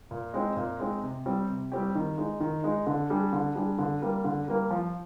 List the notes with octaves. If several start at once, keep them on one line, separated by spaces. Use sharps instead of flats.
A#2
G#3 C4 D#4
A#2
G#3 C4 D#4
C3
G3 C4 G4
C3
G3 C4 G4
D#3
G#3 D#4
D#3
G#3 D#4
D3
G3 D4 G#4
D3
G3 D4 G#4
D3
G3 A#3
D3
G3 A#3
F3